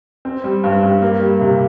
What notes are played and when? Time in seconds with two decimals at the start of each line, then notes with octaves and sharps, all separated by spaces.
0.25 C4
0.44 G3
0.64 G2
0.83 G2
1.02 A#3
1.21 G3
1.41 C3